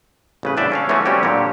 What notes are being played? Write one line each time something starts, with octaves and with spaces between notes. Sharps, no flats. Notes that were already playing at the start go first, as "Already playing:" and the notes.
A1 C#3 B4
E2 D4 D5 E5 G5
C#4 A4 F5
E3 A3 B3 C#4 F4 F#4
G3 C4 C#4 E4 F#4 G4
A#2 D3 G4 C#5